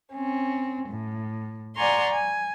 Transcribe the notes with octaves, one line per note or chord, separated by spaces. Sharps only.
C4 C#4
A2
D5 F#5 G#5 A#5 C6 C#6
G#5